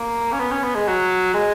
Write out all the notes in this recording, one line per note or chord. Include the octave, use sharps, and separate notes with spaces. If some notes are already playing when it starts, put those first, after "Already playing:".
Already playing: A#3
C#4
B3
C#4
B3
G#3
F#3
G#3